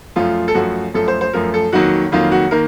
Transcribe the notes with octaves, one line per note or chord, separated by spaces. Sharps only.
F#2 F3 A3 F4
A4
F#2 F3 A3 F#4
F#2 F3 A3 A4
C5
C5
F#2 F3 A3 A#4
A4
F2 D#3 F#3 A#3 F#4
F2 D#3 F#3 A#3 F4
F#4
D#3 A#3 A#4